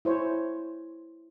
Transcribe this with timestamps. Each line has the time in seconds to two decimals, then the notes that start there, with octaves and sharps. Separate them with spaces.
0.05 E4 C5 C#5